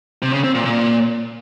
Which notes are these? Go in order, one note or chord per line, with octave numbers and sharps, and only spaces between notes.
C3
C#3
C4
A#2
A#2